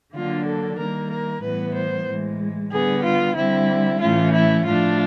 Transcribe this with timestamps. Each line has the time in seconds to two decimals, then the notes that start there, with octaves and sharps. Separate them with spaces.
0.13 D3 F#3 A#3 D4 F4
0.45 A4
0.78 D#3 G3 A#3 A#4
1.10 A#4
1.42 A2 E3 G3 B3 B4
1.74 C5
2.07 A2 E3 G#3
2.71 D3 G3 B3 G#4
3.03 F4
3.36 D3 G3 C4 E4
4.01 A2 E3 A3 C#4 F4
4.33 E4
4.65 A2 F3 A3 D4 F4